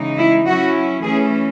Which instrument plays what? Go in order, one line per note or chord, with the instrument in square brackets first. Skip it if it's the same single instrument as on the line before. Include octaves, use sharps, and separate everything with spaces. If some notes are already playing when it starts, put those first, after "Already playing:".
Already playing: [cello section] C#3 E3 G#3 D#4
E4
F#3 C#4 E4 F#4
E3 A3 C#4 G#4